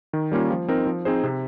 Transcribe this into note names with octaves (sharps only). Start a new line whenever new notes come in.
D#3
G3 A#3 C#4 F4
F3
C4 D#4 A#4
F3
C4 D#4 G#4 C5
C3